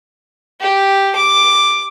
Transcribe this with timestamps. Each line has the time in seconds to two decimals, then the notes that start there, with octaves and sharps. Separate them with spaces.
0.61 G4
1.16 D6